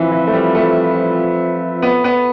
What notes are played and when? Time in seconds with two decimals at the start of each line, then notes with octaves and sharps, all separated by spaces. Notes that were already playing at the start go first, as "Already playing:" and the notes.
Already playing: E3 F3 C4 F4 B4 E5
0.12 E3
0.27 A3
0.33 G3
0.55 A3
1.82 B3
2.04 B3